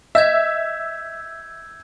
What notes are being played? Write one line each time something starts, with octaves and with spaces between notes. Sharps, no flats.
D#5 E5 E6 G6 G#6